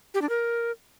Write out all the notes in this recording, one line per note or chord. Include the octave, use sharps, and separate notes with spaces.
G4
D4
A#4